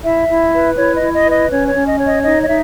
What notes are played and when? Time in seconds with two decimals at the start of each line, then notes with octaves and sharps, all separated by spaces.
0.04 E4 E5
0.28 E4
0.53 B4
0.77 E4 C#5
0.96 D#5
1.02 E4
1.14 D#5
1.26 B4
1.32 D#5
1.50 C#4 C#5
1.69 C#5
1.75 C#4
1.87 D#5
1.99 C#5
2.05 D#5
2.24 D#4 D#5
2.43 D#5
2.48 D#4 E5